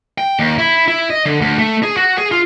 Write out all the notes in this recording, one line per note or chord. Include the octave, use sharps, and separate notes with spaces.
G5
D#2
E4
E4
D#5
D3
D2
A3
G#4
F#4
G#4
F4